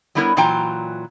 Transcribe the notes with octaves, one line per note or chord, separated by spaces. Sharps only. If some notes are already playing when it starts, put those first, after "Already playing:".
F#3 G3 B3 E4 A#4 C#5
A#2 E3 F#3 F4 G5 A#5